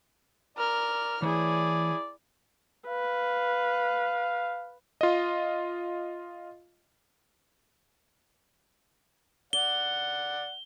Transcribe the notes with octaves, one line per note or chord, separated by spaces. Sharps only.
A#4 D5 F6
E3 E4 G#4 C#5 D5
B4 F5
F4 D#5
D5 F#5 G7